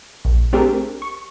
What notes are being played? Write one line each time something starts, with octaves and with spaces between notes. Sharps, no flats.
A#1
A3 C4 D4 G4 G#4 A#4
C#6